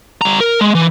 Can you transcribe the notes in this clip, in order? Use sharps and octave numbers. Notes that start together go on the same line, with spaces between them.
G3 A#5
A#4
G#3
E3